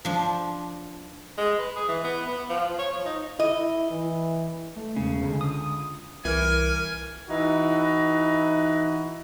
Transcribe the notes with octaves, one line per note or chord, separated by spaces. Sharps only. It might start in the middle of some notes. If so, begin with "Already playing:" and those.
F3 D4
G#3
B4
G#4
E3
B3
B3
F3
C#5
F3
D#4
E4 D#5
E3
A3
E1 C#3
C#2 D3
D#6
C2 E3 A#4 G#5
E3 D#4 E4 F#4